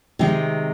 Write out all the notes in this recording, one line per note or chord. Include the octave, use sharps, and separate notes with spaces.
C3 D#3 G#3